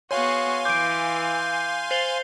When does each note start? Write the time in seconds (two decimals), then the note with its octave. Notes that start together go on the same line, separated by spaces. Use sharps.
0.11 B3 F#4 G#4 C#5 F5 G#5 C6
0.65 E3 D6 G6 D7
1.91 C5 A6 C7 F7 G7